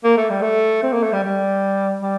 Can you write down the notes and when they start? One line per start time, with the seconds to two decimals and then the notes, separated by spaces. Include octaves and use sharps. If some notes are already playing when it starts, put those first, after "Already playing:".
0.04 A#3
0.17 A3
0.30 G3
0.42 A3
0.83 C4
0.93 A#3
1.03 A3
1.12 G3
1.24 G3
2.02 G3